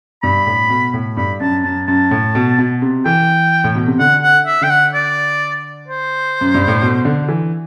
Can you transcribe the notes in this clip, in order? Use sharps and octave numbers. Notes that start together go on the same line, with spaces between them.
G2 B5
A2
B2
A2
G2 B5
F#2 A5
F#2 A5
F#2 A5
A2
B2
B2
C3
E3 G5
A2
B2
C3
D3 F#5
F#5
E5
D3 G5
F#5
D5
C5
F#2
G2
A2
B2
D3
E3